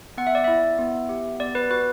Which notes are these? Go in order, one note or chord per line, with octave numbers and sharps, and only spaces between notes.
B3 F#5
E5
D5
E4 E5
B3
G4
B3 D5
B4
F#4 B4